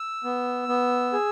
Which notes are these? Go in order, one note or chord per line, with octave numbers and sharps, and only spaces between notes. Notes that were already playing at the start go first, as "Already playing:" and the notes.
Already playing: E6
B3
B3
G#4